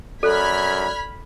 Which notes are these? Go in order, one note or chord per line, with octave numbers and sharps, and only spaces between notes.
F#2 A4 D5 B5 F6 F#6 G#6